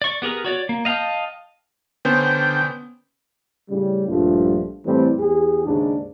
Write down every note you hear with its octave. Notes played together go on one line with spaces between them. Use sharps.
D5 C#6
B3 G4 G#4 A#4
F#4 C#5 D5
A#3
D#5 F5 G5 A5 D#6
D3 B3 C#4 C5 G5
A2 C#3 G3
A#1 G2 F3 G3 A3
A2 E3 G3 A3 C4
E2 G4 G#4
D#2 G#2 C#3 D4